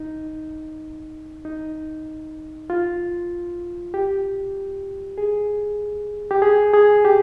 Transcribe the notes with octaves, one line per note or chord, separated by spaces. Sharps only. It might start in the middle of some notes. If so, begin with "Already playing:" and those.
Already playing: D#4
D#4
F4
G4
G#4
G4
G#4
G#4
G4